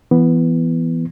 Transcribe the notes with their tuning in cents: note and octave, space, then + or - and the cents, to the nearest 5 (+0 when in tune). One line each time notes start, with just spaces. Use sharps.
E3 +20 B3 +0